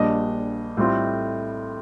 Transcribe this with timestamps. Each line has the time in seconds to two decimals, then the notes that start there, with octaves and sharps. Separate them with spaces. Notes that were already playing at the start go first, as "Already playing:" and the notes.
Already playing: A#1 A#2 G3 D4 D#5
0.77 A2 G3 C4 F4